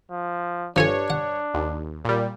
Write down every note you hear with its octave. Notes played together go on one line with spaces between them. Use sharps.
F3
G2 F3 D4 A4 C#5 G#5
F#5
D#2
A#2 G3